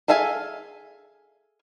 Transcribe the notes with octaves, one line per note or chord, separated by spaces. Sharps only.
G#4 A4 E5 F5 G#5